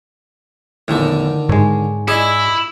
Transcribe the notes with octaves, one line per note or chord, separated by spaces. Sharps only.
A#1 E2 A2 D3 D#3
G#2 G#3 C#5
E4 G#4 D5 D#5